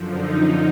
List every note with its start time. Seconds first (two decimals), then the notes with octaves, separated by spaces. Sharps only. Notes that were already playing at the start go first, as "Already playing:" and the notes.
Already playing: F#2 D3 F3
0.15 D#4